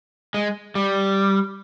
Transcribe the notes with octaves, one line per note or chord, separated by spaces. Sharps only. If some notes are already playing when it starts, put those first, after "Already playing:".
G#3
G3